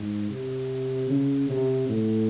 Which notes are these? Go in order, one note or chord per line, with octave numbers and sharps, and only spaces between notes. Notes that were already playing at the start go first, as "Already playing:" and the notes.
Already playing: G#2
C3
C#3
C3
A2